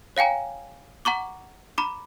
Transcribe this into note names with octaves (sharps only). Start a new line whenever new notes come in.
C#5 F5 G5 G#5 A#5
F#5 A#5 C#6 D6
A#5 B5 D6